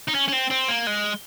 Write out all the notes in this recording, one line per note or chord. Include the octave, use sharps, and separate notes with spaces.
D#4
C#4
C#4
C4
C4
A#3
G#3